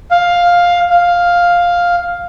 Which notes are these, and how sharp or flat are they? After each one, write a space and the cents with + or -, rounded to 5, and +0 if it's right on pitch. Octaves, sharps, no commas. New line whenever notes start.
F5 +10
F5 +5